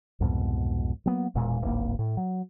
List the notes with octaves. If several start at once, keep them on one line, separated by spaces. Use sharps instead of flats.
C2 F2 G#2 B2
F#3 A#3 B3
E1 A#2 G#3
D1 G#1 A#3
A2
F#3